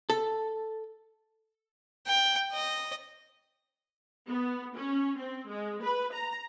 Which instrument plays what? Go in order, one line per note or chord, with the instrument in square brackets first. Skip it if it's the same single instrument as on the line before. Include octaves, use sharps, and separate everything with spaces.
[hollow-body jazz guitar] A4
[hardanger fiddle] G5
D#5
[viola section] B3
C#4
C4
G#3
B4
A#5